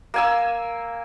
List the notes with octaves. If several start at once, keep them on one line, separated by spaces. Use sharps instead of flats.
A#3 G#5 E6